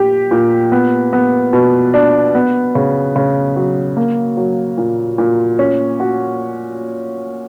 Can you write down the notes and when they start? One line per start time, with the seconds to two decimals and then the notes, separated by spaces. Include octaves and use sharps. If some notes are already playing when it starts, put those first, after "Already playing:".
Already playing: A#2 G4
0.31 A#2
0.72 B3
1.13 B3
1.53 B2
1.94 D4
2.35 B3
2.75 C#3
3.16 C#3
3.56 F#3
3.97 A#3
4.37 F#3
4.78 A#2
5.18 A#2
5.59 C#4
6.00 F#4